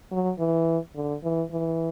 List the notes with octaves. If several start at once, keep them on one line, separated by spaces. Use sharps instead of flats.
F#3
E3
D3
E3
E3